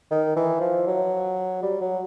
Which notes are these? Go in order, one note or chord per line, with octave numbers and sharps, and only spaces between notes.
D#3
E3
F3
F#3
G3
F#3